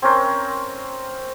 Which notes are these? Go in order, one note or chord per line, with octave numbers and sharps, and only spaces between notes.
C4 C#4 A#4 C5